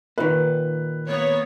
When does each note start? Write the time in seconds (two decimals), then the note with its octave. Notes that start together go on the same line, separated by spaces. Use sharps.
0.18 A#2 D#3 B4
1.07 A#3 B3 C#5